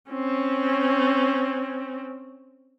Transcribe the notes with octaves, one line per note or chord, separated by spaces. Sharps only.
C4 C#4